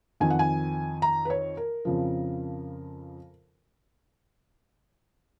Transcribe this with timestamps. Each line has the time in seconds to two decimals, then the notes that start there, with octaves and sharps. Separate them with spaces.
0.20 F2 D#3 G#5
0.30 F#5
0.39 G#5
1.02 A#5
1.25 B4
1.30 C#5
1.57 A#4
1.85 F2 C#3 F3